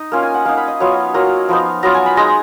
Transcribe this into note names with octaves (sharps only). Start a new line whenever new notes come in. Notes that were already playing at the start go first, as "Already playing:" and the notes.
Already playing: D#4 D#5
A#3 C#4 F4
G#5
F#5
A#3 D#4 F5
B5
D#5
F#3 B3 F4 C#5
D#5
F#3 A#3 F4 A#5
F3 B3 D#4
F#3 B3 F4 A#5
G#5
B5
G#3 D#4 A#5